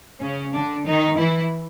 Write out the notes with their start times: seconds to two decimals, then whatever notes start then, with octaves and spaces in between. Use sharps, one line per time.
0.21 C#3 C#4
0.53 D3 D4
0.86 D#3 D#4
1.17 E3 E4